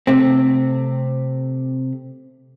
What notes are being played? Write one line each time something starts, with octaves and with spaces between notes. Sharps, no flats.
C3 A3 C4